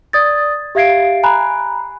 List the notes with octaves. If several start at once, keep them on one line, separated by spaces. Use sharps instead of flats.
D5 D#6 G#6 A6
G4 E5 F5 G#6 C7 D7
G#5 A#5 B5 F#6